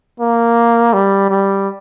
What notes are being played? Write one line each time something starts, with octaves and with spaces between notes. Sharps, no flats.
A#3
G3
G3